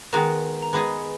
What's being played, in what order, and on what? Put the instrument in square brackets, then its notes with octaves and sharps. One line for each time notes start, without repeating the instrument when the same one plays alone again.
[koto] D#3 G#3 B3 F#4 [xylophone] A#4 A#5
[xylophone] A#5
[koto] G#3 B3 D#4 G#4 [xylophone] B4 B5